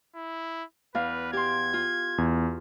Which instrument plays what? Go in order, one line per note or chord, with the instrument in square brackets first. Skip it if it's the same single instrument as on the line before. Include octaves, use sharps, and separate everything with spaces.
[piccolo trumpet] E4
[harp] E2 F5 [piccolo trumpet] B4
[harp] G4 C6 [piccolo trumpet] G#6
[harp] F4
[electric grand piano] E2